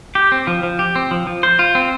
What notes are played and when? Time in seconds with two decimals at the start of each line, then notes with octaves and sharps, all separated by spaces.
0.15 G4
0.32 C4
0.47 F3
0.63 F3
0.79 G4
0.96 C4
1.11 F3
1.27 F3
1.43 C5
1.59 F4
1.75 C4